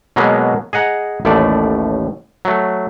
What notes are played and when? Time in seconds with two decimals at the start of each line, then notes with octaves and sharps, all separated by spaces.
0.16 B2 F#3 G#3 A#3 B3
0.73 G#4 D#5 F#5 A#5
1.25 A1 D#2 A2 A3 D5
2.45 F#3 A3